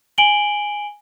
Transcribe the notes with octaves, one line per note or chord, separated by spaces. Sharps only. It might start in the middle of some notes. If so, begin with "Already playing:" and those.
G#5 D7 F#7 G7